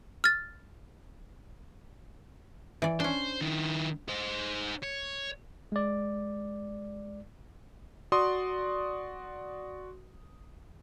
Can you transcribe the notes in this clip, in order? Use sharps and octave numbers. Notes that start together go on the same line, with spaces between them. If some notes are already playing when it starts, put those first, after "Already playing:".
F6 A6
E3 D5
C#4 D4 C5
D#3 E4
D#4 C5
C#5
G#3 D5
F#4 D5 C6 D#6